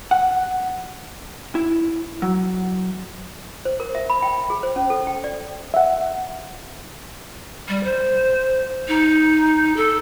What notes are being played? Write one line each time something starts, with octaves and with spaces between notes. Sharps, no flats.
F#5
E4
F#3
C5
A#4
E5
B5
G5
G#4
C5
C#4
A4
G5
D5
E5 F#5
G3
C5
D#4
A4